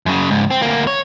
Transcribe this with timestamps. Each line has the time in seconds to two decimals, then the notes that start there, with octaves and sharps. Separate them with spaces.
0.06 F#2 C#3
0.31 C#2 G#2
0.51 C4
0.62 D2 A#3
0.87 C#5